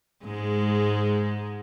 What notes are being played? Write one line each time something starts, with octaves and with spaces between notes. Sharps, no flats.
G#2 G#3